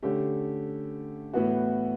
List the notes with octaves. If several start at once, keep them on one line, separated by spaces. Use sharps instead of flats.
D3 A3 C#4 G4
A2 E3 B3 F#4